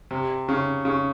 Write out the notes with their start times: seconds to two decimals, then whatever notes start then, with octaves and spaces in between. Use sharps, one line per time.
0.11 C3
0.49 C#3
0.85 C#3